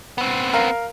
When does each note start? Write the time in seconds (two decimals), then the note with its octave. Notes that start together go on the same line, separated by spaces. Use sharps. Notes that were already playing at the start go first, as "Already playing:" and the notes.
0.18 B3 C4
0.53 A#4 F5